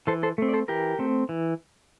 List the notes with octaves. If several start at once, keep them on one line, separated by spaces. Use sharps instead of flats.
E3 A4 C5
A4 C5
A3 C4
D5
A4 C5
E3 G4 A#4
A3 C4
E3